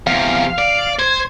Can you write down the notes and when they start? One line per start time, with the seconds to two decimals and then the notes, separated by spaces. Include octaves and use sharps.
0.07 E2 C3 F5
0.58 D5
0.99 C5 G#6